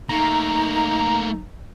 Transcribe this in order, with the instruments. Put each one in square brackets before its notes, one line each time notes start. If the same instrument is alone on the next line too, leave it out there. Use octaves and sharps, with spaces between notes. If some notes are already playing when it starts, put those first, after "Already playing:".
[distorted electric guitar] A3 A#3 [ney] D#4 [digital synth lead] A#5